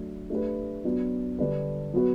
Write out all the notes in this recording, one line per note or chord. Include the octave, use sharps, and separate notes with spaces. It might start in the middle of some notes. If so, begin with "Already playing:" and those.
Already playing: F#3 A3 D4
A3 D4 G4 B4
F#3 B3 D4
D3 G3 D4 G4 B4
F#3 B3 F#4 B4